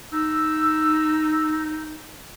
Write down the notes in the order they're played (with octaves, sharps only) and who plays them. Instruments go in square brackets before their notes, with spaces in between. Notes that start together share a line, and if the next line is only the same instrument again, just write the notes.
[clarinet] D#4 [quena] E6